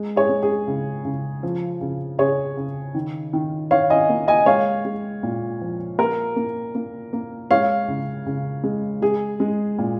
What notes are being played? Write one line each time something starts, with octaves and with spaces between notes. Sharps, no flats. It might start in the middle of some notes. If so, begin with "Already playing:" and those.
Already playing: G#3
G#4 C#5
G#3
G#4
C#3
C#3
F3
C#3
C#3 G#4 C#5
C#3
D#3
D#3
D#3 C#5 F5
D#5 G#5
A#3
D#5 G#5
G#3 C#5 F5
G#3
A#2
F3
A#3 A#4
A#3
A#3
A#3
G#3 C#5 F5
C#3
C#3
G#3
G#3 G#4
G#3
A#2